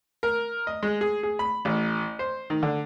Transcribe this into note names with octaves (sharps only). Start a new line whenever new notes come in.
A#4
D#5
G#3
G#4
G#4
B5
A1
C5
D#3
D3